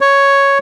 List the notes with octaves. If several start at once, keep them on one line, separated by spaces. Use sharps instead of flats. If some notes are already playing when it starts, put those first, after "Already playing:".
C#5